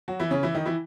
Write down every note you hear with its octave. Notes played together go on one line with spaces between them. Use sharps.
F#3 F#4
E3 E4
C#3 C#4
E3 E4
D#3 D#4
E3 E4